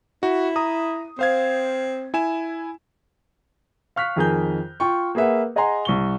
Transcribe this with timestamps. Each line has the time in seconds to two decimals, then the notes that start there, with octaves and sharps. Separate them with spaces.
0.23 E4 F#4
0.56 A#5 D#6
1.19 C4 C5 F5 G#6
2.14 E4 G#5 E7
3.96 F5 C#6 F6 F#6 B6
4.16 F2 D#3 G#4 A#4 G#5 G6
4.80 F4 G5 C#6
5.15 A#3 G#4 B4 E5 F#5
5.56 G#4 D#5 F#5 G#5 A#5 C6
5.85 C2 C#6 G7